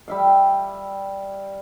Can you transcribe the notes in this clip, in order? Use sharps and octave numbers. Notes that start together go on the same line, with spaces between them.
G3 E5 F5